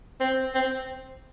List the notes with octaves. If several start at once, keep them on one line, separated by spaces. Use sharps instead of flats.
C4
C4